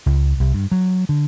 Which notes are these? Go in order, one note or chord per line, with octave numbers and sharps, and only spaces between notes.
C#2
C2
G2
F#3
D3